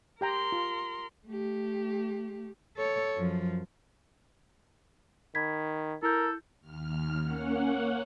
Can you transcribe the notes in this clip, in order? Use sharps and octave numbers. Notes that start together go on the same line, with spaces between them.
G4 A#4 G5 A#5 C6
F4
A3 G4
A4 C#5
F#2 F3
D#3 B5 G#6 B6
E4 A4 A#4 G6
D#2 F6
A#3 C#4 F#5